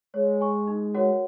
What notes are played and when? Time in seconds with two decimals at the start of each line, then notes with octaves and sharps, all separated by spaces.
0.13 G#3 C#5
0.41 G#5 C#6
0.67 D#4
0.94 F#4 A#4 C#5 F#5